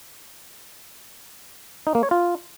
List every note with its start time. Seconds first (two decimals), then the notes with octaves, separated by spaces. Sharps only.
1.87 D#4
1.95 A#3
2.03 C#5
2.11 F4